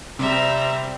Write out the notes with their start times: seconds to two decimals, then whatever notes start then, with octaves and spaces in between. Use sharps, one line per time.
0.19 C3 G3 C4 G4 E5 A#5